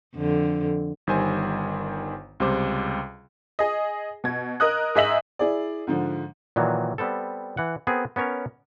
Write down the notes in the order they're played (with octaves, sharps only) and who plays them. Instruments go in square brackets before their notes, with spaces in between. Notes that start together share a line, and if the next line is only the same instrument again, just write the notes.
[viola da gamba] F2 D3
[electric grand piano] G1 D#3 G3 C5 G#5 C6
C#2 C3 G3 C5 D6
[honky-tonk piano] G#4 D#5
B2 G#6
A#4 D#5 D#6 F#6
G#2 G#4 D#5 E5 B6 F#7
[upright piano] E4 G#4 D5
G#2 D3 F3
[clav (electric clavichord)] A#2 D#3 E3 F#3
G3 B3 C4 A4
E3 F#5
B3 C4 G#4 A#4
B3 C#4 A#4 C#5